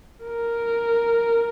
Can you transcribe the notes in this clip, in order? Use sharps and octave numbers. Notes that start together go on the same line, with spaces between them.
A#4